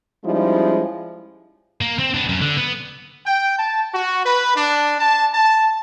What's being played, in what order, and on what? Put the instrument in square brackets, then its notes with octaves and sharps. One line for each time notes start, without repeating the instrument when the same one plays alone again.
[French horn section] F3 G3 G#3 C#4 D#4 E4
[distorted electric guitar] A#3
C4
B3 D4
F#2
D3
B3
[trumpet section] G5
A5
F#4
B4
D4
A5
A5